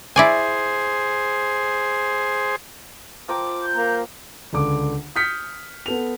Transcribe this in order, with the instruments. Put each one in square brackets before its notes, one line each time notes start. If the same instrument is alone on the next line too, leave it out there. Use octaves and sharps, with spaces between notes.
[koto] E4 D5 G#5 [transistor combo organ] G#4 C5
[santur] F3 A#4 G5 [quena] D6
[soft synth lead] G6
[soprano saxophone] A#3 [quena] A#5
[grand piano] C#2 D3 D6
D#6 F6 G6 B6 C#7
B3 A4 F7